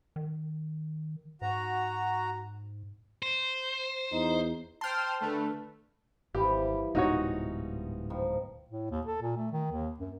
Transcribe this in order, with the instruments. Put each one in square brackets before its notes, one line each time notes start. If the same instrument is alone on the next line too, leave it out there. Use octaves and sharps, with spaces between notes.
[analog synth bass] D#3
[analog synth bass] G#2 [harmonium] F#4 A#5
[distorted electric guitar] C5
[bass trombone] E2 [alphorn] D#4
[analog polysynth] C5 G5 C6 [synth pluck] A5 F6
[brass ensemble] D3 A4 B4 [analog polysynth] A3
[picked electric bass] G#1 [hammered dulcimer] E3 F3 G3 [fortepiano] G4
[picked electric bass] D1 G#2 B2 [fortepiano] D#4 F#4 C#5
[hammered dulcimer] D#3 F3
[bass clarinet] A2
D#2
A4
A#2
A3
D#3
D#2
F#2